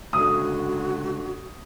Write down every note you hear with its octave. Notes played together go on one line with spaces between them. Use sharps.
C#2 D3 F#4 D#6